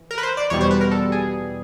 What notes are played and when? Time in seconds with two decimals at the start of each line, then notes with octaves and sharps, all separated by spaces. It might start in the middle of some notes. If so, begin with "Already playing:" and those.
Already playing: E3
0.11 A#4
0.18 B4
0.23 C5
0.37 D5
0.50 E2 B2 G3 C#5
0.61 C5
0.71 B4
0.81 A#4
0.91 A4
1.12 G#4